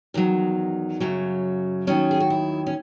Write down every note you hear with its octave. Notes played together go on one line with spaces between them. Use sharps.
E2 D#3 F#3
F#2 C#3 F#3
D#2 D#3 F#3 C#4
G#4
F#4
E4
C#4